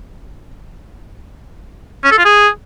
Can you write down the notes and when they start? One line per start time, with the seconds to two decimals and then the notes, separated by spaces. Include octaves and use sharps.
2.04 C#4
2.11 A4
2.18 F4
2.25 G#4